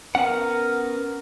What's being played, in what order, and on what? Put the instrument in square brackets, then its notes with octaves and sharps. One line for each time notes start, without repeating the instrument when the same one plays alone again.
[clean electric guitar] B3 C#4 F#5 [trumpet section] A#4